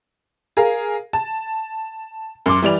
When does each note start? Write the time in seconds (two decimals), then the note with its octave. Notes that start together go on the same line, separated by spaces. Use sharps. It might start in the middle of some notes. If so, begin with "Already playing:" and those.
0.57 G#4 A#4 F5
1.13 A5
2.46 F#2 C6 D6
2.62 E3 G3 D5 F7